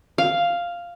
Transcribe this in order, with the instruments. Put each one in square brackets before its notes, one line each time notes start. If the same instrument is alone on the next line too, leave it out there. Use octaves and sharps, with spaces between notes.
[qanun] F5